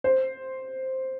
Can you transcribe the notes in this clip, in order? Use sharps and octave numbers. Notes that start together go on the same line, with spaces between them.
C5